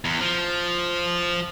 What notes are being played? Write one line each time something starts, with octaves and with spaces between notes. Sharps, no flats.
E2
F3